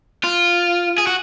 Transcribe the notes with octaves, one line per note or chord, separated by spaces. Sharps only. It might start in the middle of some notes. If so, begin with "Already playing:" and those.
F4
G#4
F#4